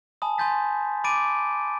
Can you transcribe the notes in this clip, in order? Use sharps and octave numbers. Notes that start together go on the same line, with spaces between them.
G#5 A5 B5 D#6
G#5 C6 D#6 G6 A6 B6
B5 D6 A6 D7 D#7